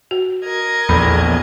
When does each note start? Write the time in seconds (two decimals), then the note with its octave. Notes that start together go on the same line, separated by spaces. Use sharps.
0.11 F#4
0.45 A#4 D#5 G#6
0.89 A#1 E2 A4 B5